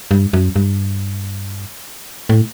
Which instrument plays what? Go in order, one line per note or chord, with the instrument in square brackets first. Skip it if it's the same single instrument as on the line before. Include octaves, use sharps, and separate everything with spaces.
[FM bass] G2
F#2
G2
A2